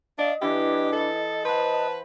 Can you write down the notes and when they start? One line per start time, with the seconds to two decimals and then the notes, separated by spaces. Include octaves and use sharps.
0.19 D4 D#5 F5
0.42 E3 D4 E4 G4
0.92 A4
1.45 B4 C5 F#5 A5